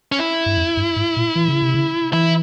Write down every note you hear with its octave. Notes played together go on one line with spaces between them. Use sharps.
C#4
E4
G2
F2
G2
G#2
A#2
E3
C#3
C3
C#3
E3 E4